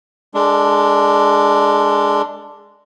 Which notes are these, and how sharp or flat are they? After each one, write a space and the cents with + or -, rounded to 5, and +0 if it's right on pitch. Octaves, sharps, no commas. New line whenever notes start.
G#3 +0 D4 +0 A4 +35